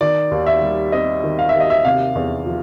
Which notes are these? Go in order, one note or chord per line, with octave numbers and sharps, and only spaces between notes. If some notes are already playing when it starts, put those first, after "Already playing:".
D#3 D5
D#2
E5
G3
C4 D#5
D#3
F5
E5
D#2
D#5
E5
C3 F5
E2
F3